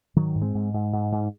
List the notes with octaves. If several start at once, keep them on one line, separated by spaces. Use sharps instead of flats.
G#2 D#3 F#3
G#2
G#3 C4
G#2
G#2
G#2
G#2